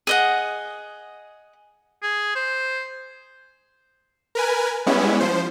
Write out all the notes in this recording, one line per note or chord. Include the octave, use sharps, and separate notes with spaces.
G#4 D#5 F#5
G#4
C5
A#4 B4 G#5
G3 G#3 B3 C#4 E4
F3 C5